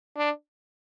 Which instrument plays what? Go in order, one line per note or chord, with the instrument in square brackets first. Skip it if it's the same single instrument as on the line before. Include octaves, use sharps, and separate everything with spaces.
[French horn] D4